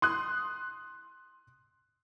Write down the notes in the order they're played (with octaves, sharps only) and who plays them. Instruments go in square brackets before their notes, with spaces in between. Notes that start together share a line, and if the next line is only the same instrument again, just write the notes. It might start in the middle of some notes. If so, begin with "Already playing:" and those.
[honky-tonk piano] C6 D#6 F#6